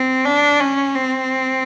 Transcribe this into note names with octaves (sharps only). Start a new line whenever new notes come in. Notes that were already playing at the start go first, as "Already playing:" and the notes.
Already playing: C4
D4
C#4
C4